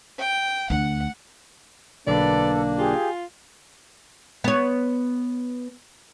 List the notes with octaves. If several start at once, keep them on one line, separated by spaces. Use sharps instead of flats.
G5
D2 F#5
B1 D3 A#3 D4 A4 B4 D5
F4 G4 G#4 G#5
B3 C#5